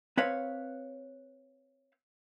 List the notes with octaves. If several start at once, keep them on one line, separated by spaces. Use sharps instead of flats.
C4 B4 C#5 F5